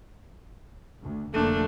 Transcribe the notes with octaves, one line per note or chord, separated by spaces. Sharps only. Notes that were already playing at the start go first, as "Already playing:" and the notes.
D2
F1 D3 A3 A#3 D4